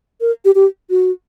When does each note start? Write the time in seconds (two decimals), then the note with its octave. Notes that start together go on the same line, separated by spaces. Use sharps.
0.21 A#4
0.45 G4
0.55 G4
0.90 F#4